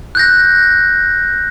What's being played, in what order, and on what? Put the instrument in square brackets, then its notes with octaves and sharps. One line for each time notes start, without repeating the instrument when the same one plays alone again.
[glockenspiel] F#6 G6 A#6